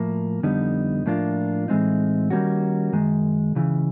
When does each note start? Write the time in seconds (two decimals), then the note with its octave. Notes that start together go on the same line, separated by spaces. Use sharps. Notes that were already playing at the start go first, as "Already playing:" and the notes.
Already playing: A2 F3 A#3
0.43 F2 D3 G3 B3 D#4
1.06 A2 F3 A#3 D4 F4
1.68 A2 E3 G#3 C4 D#4
2.30 D#3 G3 A#3 C#4 F#4
2.93 F#2 D#3 G#3
3.55 C#2 C#3 E3